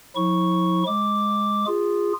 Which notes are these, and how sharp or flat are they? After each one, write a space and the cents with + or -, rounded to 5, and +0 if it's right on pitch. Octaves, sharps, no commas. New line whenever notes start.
F3 +45 E4 -30 C#6 +0
G#3 +0 D6 +0
F4 +0 G#4 -20